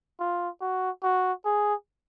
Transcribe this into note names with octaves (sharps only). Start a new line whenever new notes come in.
F4
F#4
F#4
G#4